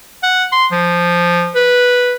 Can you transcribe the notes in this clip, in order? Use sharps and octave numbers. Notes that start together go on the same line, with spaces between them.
F#5
C6
F3
B4